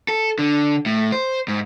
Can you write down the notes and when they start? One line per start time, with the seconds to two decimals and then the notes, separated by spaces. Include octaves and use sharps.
0.08 A4
0.39 D3
0.86 A2
1.12 C5
1.48 G#2